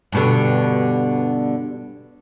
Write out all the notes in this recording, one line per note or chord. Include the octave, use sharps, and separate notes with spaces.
G2 B2 D3